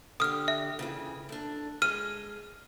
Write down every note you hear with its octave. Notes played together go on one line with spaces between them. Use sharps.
D3 G4 D#6 F6
E5
C#3 E3
A3 D4
G#3 F6 D#7